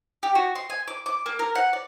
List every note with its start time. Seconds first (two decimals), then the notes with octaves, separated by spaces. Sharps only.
0.23 G4
0.35 F#4
0.55 C6
0.70 G#5
0.88 D6
1.06 D6
1.26 A#3
1.39 A#4
1.55 F#5
1.73 D5